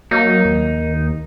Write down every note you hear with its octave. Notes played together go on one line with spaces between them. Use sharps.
F#3 A#3 D#4
D#2